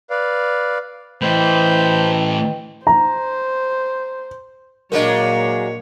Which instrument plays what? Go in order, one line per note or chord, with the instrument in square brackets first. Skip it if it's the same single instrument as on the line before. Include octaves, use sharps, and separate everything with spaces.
[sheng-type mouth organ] B4 D5 F5
[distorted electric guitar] A2 E3 [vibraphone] B4 D#5 G5 [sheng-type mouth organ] C5 B5 G6
[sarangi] C5 [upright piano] A#5
[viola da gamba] A#2 C#5 [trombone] F#3 [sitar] G#3 A#3 D4 [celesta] A#4 D#5